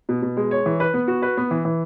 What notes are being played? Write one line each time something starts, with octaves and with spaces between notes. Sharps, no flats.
B2
B2
G#3
C#5
E3
B4
B3
F#4
B4
B3
E3
E3